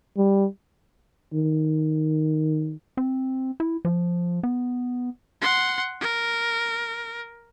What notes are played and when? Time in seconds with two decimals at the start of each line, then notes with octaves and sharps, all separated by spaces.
0.17 G3
1.33 D#3
2.97 C4
3.60 E4
3.85 F3
4.43 B3
5.42 F#5 C6
6.01 A#4